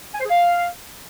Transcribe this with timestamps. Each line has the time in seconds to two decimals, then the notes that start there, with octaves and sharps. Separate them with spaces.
0.15 G#5
0.20 C5
0.25 G#4
0.30 F5